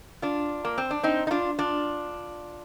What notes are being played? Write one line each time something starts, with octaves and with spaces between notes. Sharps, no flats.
D4 F4
A#3
C4
D4
C4 D#4
D#4
D4 F4
D4 F4